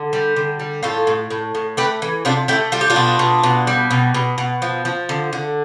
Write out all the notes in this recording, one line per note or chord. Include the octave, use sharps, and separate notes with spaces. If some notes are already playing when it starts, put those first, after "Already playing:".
Already playing: D3
G3
D3
G3
A2 F4 A4
A2
A2
A2
A3 G4 B4
E3
C3 D4 F4
A3 E4 G4
G3 F4
G4
D4 F4
B2
B2
B2
G3
B2
B2
B2
F3
F3
D3
D3